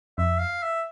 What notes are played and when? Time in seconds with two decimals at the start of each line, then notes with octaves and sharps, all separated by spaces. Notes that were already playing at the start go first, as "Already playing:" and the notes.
0.18 F2 E5
0.40 F5
0.63 E5